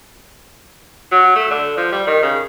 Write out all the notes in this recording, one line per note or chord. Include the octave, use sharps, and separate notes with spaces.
F#3
A3
D3
F3
G3
D#3
C#3